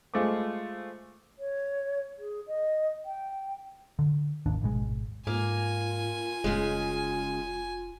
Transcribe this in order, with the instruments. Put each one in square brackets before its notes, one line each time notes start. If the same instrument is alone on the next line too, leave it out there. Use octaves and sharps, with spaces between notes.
[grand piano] G#3 A3 F4 C5 D6
[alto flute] C#5
G#4
D#5
G5
[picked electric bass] D3
G#1 D#2 D4
D#1 G#1 B2 G#3
[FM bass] G#2 [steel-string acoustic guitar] A#3 [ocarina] F4 [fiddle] G#5
[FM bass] F1 [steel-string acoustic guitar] C#3 G#3